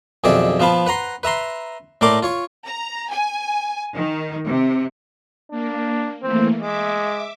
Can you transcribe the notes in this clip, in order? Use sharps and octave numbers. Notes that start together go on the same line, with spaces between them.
B1 F2 D#3 G#4 D5 E5
F3 B3 F5 A5 B5
B4 F#5 A#5 C6
B4 E5 A#5 C6
A2 A3 A#4 D5 C6 D6
F4 C#5 C#6
A#5
G#5
D#3
C3
A#3 D4
E3 A3 A#3 C4
G#3 E5 D6